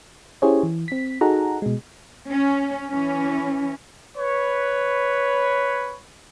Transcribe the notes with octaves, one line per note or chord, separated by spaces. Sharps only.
C#4 E4 G4 G#4 C5 C#5
E3
C4 B6
D#4 F#4 G#4 A4 F#5 A#5
B2 G#3
C#4
E3 C#4
B4 C#5